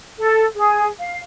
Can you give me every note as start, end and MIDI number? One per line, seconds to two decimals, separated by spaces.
0.19 0.44 69
0.55 0.86 68
0.99 1.19 77